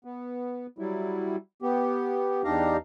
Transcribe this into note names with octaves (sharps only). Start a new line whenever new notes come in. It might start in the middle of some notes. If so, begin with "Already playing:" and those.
B3
F#3 G3 E4
B3 G4
E2 D4 D#4 G4 F5 A#5